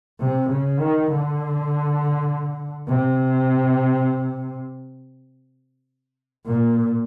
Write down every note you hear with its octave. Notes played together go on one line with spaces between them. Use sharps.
C3
C#3
D#3
D3
C3
A#2